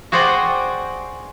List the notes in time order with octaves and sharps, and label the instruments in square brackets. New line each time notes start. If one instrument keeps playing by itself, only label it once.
[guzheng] F#4 G#4 C5 D5 F#5 G5